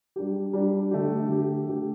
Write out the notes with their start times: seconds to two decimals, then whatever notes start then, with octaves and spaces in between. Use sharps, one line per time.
0.16 G3 D4 G4
0.53 G3 D4 G4
0.91 D3 A3 G4
1.28 D3 A3 G4
1.65 D3 A3 G4